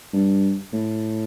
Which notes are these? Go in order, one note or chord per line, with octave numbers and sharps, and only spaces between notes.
G2
A2